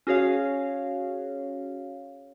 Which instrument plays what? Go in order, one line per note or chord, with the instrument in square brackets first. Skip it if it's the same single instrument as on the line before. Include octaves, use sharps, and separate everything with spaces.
[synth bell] C#4 F#4 G#4 C#5 F5